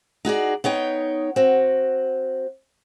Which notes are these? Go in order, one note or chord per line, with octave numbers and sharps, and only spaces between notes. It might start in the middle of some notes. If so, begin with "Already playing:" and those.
D#4 F#4 G#4 D5
B3 D#4 C#5 G5
C4 F#4